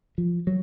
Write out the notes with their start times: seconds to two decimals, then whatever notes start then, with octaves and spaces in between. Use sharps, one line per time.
0.18 F3
0.47 F#3